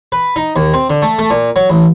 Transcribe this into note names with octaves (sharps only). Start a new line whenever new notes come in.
B4
D#4
D#2
C4
D3
A3
A3
A#2
F#3
A1